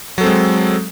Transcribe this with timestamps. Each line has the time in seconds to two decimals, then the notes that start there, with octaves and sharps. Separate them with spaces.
0.18 F#3
0.21 A4
0.23 C4
0.26 G#3